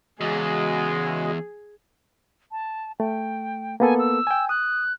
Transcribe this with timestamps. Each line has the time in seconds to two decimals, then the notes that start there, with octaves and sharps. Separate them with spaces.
0.21 E2 C#3 G#3 F#4 G#4 D#5
2.52 A5
3.00 A3 G5
3.80 A#3 B3 A4 G#5
3.99 E6
4.27 G5 G#5
4.49 D#6 F#6